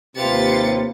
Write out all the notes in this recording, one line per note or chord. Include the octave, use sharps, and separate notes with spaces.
D#2 C3 A#3 F4 B4 A6 C#7